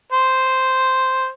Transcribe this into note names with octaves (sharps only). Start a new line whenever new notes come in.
C5